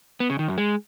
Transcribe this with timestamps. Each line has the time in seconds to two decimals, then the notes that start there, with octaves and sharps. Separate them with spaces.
0.20 B3
0.30 C#3
0.39 D#3
0.48 F#2
0.58 G#3